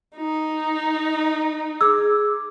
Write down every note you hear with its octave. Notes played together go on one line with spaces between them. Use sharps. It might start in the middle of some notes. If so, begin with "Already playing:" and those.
D#4
G#4 D6 E6